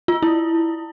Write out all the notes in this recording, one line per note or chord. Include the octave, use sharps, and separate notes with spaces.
F4
E4